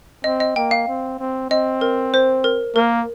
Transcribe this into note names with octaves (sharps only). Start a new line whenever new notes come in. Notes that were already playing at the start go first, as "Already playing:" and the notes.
C4 D#5
D#5
A#3 G5
F5
C4
C4
C4 D#5
A#4
C5
A#4
A#3 A#4